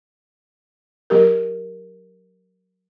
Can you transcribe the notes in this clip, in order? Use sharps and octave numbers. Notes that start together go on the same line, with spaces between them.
F#3 G4 A#4